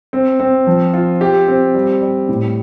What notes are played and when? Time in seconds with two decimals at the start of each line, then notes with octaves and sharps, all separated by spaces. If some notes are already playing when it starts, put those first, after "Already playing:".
0.13 C4
0.40 C4
0.67 F3
0.94 F4
1.21 G4
1.48 C4
1.75 G3
2.02 G3
2.29 A2